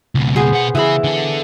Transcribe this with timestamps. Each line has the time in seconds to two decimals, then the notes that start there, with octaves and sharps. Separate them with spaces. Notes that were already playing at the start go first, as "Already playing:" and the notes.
0.15 C#2 B2
0.36 B3 G#4 C5
0.53 B2 F#5
0.75 C#3 E3 G#4 B5
1.04 D3 A4